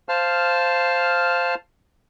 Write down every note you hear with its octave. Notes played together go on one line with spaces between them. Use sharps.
C5 F5 A5 F6